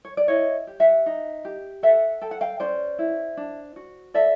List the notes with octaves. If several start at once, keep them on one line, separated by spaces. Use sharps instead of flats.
C#5
D5
E4 C#5 D#5
G4
E5 F#5
D#4
G4
A4 E5 F#5
A4 G5
F#5
F5 G5
C#4 C5 D5
E4
D4
F#4
A4 D5 E5